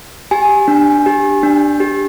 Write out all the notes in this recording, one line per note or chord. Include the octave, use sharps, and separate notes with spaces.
G4 G#5
D4
G4
D4
G4